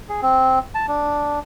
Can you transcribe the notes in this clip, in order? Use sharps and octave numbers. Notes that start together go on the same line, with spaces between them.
G#4
C4
A5
D4